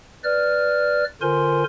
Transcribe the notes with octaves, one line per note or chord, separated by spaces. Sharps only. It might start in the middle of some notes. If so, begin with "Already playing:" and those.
B4 D5 F6
D3 F4 A#4 C5 G#5 C6